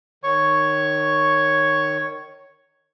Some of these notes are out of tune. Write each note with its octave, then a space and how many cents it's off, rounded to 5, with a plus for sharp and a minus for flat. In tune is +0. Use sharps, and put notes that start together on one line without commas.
D#3 -20 C#5 +0 C#6 +0